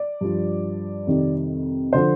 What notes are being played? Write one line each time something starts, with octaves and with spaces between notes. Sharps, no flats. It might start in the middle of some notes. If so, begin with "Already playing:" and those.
Already playing: D5
G2 F3
F2 C3 D#3 G3
D3 F3 C5